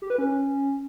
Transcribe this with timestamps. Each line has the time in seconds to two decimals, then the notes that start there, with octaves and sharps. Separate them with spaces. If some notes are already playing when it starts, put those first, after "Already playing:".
0.02 G4
0.10 B4
0.18 C#4